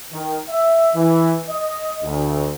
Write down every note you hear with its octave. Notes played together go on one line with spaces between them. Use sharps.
D#3
E5
E3
D#5
D2